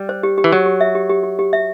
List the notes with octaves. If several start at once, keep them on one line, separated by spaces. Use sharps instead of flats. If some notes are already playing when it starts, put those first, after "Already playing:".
Already playing: G3
C5
G4
G4
E3
F#3 G4
G4
E5
G4
G4
G4
G4
E5